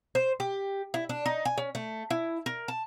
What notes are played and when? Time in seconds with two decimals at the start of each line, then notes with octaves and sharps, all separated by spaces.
0.15 C5
0.40 G4
0.94 E4
1.09 D4
1.26 D#4
1.45 G#5
1.58 C#4
1.75 A3
2.10 E4
2.46 A#4
2.68 A5